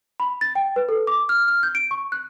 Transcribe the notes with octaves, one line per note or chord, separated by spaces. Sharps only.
B5
A6
G5
B4
A4
D6
F6
F6
G6
D7
C#6
F#6